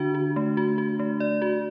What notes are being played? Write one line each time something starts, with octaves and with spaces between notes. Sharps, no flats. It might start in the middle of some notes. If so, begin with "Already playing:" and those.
Already playing: D3 D4 F#4
F#4
A3
F#4
F#4
A3
D5
F#4